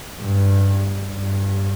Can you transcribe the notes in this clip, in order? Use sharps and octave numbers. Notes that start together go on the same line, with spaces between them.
G2
G2